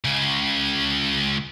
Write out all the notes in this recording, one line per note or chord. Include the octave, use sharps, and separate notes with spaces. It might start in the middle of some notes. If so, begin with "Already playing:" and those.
C#2 C#3